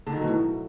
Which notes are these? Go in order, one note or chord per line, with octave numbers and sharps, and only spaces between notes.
D3
D#3
F#3
B2
A2